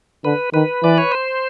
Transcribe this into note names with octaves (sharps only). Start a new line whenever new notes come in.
D3 B4
D#3 B4
E3 D5
C#5
C5